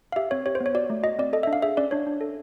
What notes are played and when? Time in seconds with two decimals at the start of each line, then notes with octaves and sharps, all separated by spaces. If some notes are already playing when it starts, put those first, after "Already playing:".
0.12 F5
0.16 G4 E5
0.31 C4 C#5
0.46 G4 C#5
0.55 C5
0.61 B3
0.66 C#5
0.75 F#4 D5
0.90 A3
1.03 F#4 D#5
1.19 C4 D5
1.33 A4 D#5
1.43 E5
1.47 D4
1.53 F5
1.62 G#4 E5
1.77 C#4 D5
1.91 D4 C#5
2.07 D4
2.21 A4